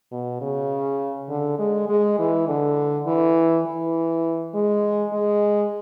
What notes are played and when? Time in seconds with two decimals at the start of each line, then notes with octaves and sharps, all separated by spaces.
0.12 B2
0.41 C#3
1.29 D3
1.59 G#3
1.89 G#3
2.19 E3
2.48 D3
3.07 E3
3.66 E3
4.54 G#3
5.13 G#3